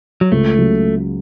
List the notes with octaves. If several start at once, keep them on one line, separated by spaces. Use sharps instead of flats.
F#3
C#2 A3
C#3 F#3